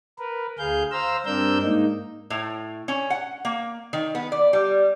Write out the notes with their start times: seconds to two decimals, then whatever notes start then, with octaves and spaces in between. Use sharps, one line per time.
0.19 A#4 B4
0.58 D2 G#4 F5 G6
0.92 C5 F5 A#5 E6
1.26 G2 C4 D4 A#4 E6 G6
1.63 G#2 A#3 D#4
2.30 A2
2.88 C#4
3.10 F#5
3.45 A#3
3.93 D#3
4.15 B3
4.32 D5
4.53 G3